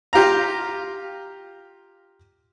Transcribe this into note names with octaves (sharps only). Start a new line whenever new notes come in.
F4 G4 F5 A#5